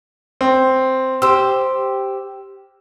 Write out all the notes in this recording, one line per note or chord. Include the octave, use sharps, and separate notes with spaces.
C4
G4 C5 E6